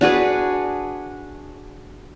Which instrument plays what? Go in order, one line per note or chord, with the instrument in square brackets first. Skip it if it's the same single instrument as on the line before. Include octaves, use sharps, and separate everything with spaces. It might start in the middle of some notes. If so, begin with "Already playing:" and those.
[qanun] D4 F#4 G#4 B4